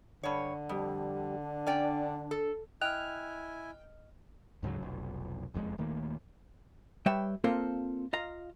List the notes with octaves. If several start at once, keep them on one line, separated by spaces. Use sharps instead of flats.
G2 D3 C#5
F2 G3
D4
C#4 D5 G5
A4
E4 D#5 G5 G#5 F6 F#6 F7
D2 G#2 C#3 F#3
F1 B1
F#1 F2 B2 G#3
D#1 D#3 A3 A#3
G3 B4 C#5 E5 G5
A#3 C4 F4 A4 A#4 C5
F4 D#5 F5 A#5